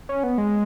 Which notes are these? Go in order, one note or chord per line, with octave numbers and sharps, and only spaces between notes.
C#4
B3
G#3